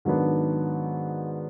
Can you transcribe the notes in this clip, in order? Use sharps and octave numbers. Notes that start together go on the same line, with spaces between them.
G#2 D#3 F#3 B3 D4